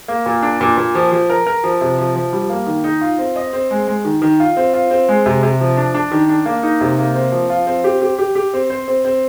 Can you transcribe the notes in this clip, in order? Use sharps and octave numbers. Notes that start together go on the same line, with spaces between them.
A#3
A#2
D4
A#2
A#2
F3
F3
A#4
A#4
F3
C3
F3
F3
G3
A#3
D#3
D#4
F4
C4
D#5
C4
G#3
G#3
D#3
D#3
F4
C4
F4
C4
G#3
C3
C3
F3
D4
D4
D#3
D4
A#3
D#4
C3
A#3
C4
F3
F4
C4
G4
G4
G4
G4
C4
C5
C4
C4